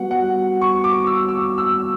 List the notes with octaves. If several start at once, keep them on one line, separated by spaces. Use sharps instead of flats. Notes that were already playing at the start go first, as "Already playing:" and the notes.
Already playing: G3 B3 F#4 F#5
F#5
C#6
D6
E6
E6
E6